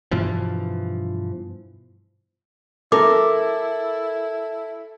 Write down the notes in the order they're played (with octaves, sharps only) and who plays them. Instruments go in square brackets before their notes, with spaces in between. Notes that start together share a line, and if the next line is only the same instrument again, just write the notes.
[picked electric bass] G2 B2 E3 F3
[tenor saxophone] E4 [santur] A4 [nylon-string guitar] A#4 [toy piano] D6